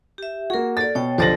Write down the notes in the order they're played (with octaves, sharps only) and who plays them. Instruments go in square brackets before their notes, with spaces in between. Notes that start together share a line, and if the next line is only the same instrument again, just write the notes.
[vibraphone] G4 E5
[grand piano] A#3 F#4 [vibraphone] G#4 A#4
[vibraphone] A4 D5 [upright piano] A6
[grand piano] B2 [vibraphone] C#5 G5
[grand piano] B1 D3 F#7 [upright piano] F3 A6 A#6 [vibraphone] C5 D5